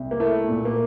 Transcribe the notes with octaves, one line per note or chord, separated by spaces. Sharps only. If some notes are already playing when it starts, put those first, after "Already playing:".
Already playing: C2
A#3
A3 E4
A#2
A#3